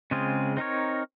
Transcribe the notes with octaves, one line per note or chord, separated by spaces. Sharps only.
C#3 G#3 C4 F4 G#4
C4 D#4 A#4 C#5